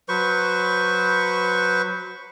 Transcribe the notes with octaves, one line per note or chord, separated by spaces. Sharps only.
F#3 B4 C5 C#6